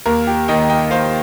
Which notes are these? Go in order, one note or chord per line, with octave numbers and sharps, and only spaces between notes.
D#2 A#4
G4
D#3 A#3 D#5 G5
D#5 G5
D#2 C5 F5